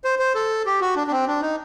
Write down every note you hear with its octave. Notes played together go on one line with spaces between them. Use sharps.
C5
C5
A4
G4
F#4
D4
D4
C4
D4
D#4